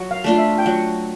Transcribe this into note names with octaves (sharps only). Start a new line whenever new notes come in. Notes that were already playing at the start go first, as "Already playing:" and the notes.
Already playing: F#3
F5
A3 D4 F4
E5
G5
F#3 F#5